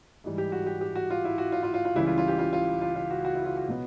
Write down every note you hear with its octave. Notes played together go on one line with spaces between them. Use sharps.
G#2 E3 G3
G4
F#4
G4
G4
F#4
F4
E4
F#4
F4
F4
F4
F4
C#2 C#3 E3 G3 E4
F4
F4
G4
F4
F4
F4
F4
F#4
F#4
E4
F4
F#4
B2 F#3 B3